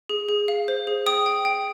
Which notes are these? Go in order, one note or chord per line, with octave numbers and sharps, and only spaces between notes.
G#4
G#4
F5
C5
G#4
G5 D#6
G5
G5